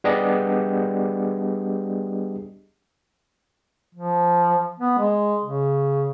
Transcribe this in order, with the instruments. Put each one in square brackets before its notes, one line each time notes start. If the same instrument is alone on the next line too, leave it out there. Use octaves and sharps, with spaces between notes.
[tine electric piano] G3 B3 D4 G4 G#4 D#5
[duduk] F3
B3
G#3
C#3